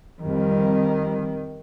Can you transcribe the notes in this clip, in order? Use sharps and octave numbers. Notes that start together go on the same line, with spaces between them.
F2 D#3 G3